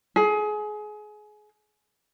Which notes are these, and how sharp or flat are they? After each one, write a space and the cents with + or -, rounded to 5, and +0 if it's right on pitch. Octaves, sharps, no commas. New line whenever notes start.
G#4 +25